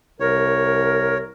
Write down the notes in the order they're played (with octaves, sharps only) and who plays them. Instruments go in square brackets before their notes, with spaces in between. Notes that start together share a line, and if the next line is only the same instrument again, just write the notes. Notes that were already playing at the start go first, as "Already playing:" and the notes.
[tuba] C2 [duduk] A#4 [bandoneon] C#5